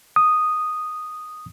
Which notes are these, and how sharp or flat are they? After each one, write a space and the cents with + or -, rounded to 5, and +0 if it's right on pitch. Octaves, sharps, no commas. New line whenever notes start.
D#6 -5